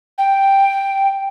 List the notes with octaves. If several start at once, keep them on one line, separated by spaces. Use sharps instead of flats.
G5